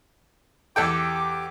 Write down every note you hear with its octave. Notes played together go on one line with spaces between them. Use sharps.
E2 G4 A4 G5 D6